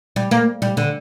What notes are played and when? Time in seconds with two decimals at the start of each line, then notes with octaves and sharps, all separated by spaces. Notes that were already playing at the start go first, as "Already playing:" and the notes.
0.16 G3
0.31 A#3
0.62 G3
0.77 D3